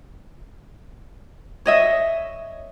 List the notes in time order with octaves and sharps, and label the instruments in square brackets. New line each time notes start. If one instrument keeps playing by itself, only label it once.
[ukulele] C#5 D#5 E5